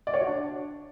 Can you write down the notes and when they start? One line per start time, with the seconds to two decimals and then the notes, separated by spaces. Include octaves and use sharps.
0.07 D5
0.14 C#5
0.20 F#4
0.27 D4